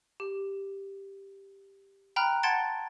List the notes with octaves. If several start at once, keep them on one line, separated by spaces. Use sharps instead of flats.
G4
G5 A#5 B5 F6 F#6
F#5 A5 C6 G#6 A6 D7